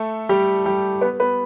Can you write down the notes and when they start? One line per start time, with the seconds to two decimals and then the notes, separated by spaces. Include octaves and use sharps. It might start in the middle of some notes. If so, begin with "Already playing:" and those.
Already playing: A3 A4
0.29 G3 G4
0.66 G3 G4
1.01 B3 B4
1.20 B3 B4